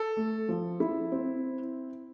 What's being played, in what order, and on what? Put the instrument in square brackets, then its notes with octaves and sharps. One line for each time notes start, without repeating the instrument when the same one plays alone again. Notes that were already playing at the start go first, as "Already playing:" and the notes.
Already playing: [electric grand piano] A4
[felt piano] A3
F3
E4
C4